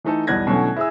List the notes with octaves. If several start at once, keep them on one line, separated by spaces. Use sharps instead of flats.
E3 A3 D#4 A4
B1 E2 G3 F#6 G#6 A#6
B2 D3 E3 F#3 A3 C#4
E4 G#4 E6